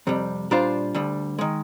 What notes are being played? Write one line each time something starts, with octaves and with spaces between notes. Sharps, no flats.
F2 C3 G3
A#2 G3 D4 F4 C5
D2 D3 G3
D#3 G#3